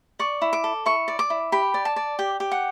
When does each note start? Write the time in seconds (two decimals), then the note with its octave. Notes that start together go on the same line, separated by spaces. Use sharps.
0.19 D5 C#6
0.42 E4
0.53 D6
0.64 A4
0.86 E4 C#6
1.08 D5
1.19 D6
1.30 E4
1.52 G4 B5
1.74 D5
1.85 A5
1.96 D5
2.19 G4
2.40 G4
2.51 F#5